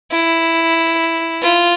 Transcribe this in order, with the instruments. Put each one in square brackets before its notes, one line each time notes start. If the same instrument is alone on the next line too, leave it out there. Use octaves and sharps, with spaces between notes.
[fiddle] E4
F4